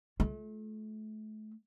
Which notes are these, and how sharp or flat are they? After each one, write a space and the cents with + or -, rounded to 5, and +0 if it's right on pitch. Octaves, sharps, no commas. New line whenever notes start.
A3 -35 F4 +0